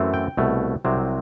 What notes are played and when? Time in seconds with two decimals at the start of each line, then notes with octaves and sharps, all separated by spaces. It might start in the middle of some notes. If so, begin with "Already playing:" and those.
Already playing: F#2 E3 A3 C4
0.14 G5
0.37 C2 B2 A3
0.85 C2 C3 F#3 C4